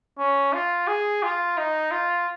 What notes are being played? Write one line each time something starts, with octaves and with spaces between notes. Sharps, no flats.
C#4
F4
G#4
F4
D#4
F4